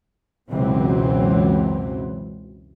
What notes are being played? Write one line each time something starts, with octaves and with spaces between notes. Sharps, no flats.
C#2 F#2 B2 E3 F#3 C4